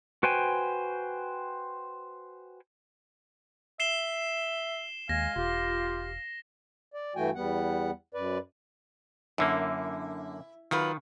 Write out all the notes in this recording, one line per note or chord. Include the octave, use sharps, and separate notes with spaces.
F#4 B4 C5 G5 G#5
E5 C7 E7 G7
D#2 G#3 F5 G#5 A#6
E1 F4 G4
D5
G2 E3 A3 F#4 G5 G#5
E2 G3 B3 F#5
F#2 B4 D5
F#2 D3 A#3 E4
D#3 F#3 F4 B4